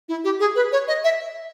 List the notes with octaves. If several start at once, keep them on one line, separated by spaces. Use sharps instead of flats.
E4
G4
G#4
B4
C#5
D#5
E5